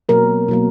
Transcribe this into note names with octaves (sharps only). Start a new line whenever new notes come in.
B2 F#3 A#3 A#4
B2 F#3 A#3